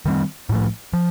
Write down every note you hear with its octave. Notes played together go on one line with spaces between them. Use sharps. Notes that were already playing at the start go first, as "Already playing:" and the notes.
D#3 G3 C4
A2 F3 A3
F3